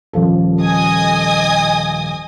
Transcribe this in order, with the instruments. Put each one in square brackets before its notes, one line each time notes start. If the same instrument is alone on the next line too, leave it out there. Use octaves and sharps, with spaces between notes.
[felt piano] D#1 F3 A4
[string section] D#5 G#5 D#6